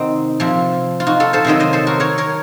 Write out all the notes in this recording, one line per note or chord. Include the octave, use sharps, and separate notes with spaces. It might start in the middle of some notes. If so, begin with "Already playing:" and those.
Already playing: C3 D#3 C4 D#4 F#4
C3 F3
F4
D#4 F#4
F4 A4
A4 C5
C3 D#3 F#3 C5 D#5
C5 D#5
A4 C5
F#4 A#4
A#4 C#5
A#4 C#5